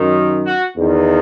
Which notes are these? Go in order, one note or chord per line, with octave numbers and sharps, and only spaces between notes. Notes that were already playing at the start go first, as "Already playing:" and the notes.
Already playing: F#2 D#3
F#4
E2 D#3